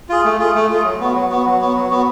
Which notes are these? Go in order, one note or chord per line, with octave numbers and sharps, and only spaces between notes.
F4 G#4
A3
F4 G#4
A3
F4 G#4
F#3
B3 F#4
F#3
B3 F#4
F#3
B3 F#4
F#3
B3 F#4